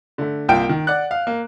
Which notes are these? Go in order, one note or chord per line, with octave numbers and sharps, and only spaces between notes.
D3 A3
C2 A#3 F4 G5 D7
D#3
D5 F#5 F#6
F5
A#3